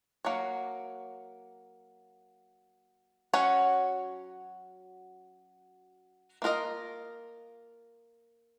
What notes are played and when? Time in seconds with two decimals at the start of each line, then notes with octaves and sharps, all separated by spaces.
0.25 F#3 A#3 C#5
3.33 F#3 C#4 F#4 C#5
6.42 A#3 F4 A#4 D#5